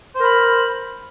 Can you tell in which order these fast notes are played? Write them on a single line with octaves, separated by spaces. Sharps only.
C5 A#4 B5